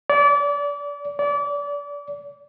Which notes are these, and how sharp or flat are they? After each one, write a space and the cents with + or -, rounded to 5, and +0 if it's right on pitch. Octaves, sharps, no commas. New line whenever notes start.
D5 -30
D5 -30